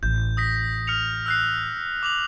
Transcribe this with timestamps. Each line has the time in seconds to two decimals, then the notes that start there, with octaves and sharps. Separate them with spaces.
0.03 A1 G6
0.37 D#6 A#6 B6
0.87 F6 C#7 F7
1.26 E6 F#6 C7
2.03 D6 F7 F#7